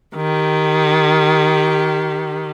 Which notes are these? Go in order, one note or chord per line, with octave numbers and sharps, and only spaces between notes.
D#3 G4